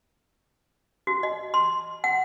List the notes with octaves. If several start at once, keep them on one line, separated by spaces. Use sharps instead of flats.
F#4
D#5
C6
F#5